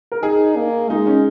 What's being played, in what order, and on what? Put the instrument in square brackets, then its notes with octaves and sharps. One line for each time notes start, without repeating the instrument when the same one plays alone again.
[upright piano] A#4
[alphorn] D#4 [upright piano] G#4
[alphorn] A#3
[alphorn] G#3 [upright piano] D#4
[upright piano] C#4